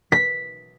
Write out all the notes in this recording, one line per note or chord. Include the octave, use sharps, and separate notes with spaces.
B6